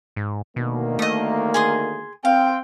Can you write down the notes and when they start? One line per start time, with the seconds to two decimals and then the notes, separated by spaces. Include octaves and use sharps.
0.16 G#2
0.56 D2 B2 D#3 A#3
0.99 A3 D#5 D#6
1.54 G#4 C6 D#6
2.25 C4 F5 G5